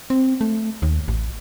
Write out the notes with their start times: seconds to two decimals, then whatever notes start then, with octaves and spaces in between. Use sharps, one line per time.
0.10 C4
0.41 A3
0.82 D#2
1.08 A1